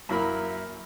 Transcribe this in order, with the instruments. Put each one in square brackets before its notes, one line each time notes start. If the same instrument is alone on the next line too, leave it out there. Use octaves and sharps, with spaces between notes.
[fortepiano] F#2 A#3 E4 A#4 B5